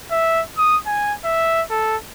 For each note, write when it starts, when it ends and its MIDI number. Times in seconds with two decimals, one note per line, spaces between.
0.11 0.42 76
0.58 0.77 87
0.86 1.13 80
1.25 1.63 76
1.70 1.96 69